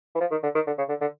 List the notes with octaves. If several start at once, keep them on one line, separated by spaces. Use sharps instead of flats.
E3
F3
D#3
D3
D#3
D3
C#3
D3
D3